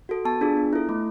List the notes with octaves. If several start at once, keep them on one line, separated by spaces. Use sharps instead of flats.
F#4 A4
B3 A5
D4 F4 G#4
B3
E4 A4
A3